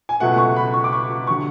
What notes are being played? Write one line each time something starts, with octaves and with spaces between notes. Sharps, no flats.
G#5
C#2 B2 F#3 A3 F#5
C#6
B5
C#6
D6
C#6
D3 F#3 C#6